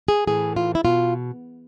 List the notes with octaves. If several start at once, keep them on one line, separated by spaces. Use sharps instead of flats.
G#4
A2 E3 G#4
F4
E4
B2 F4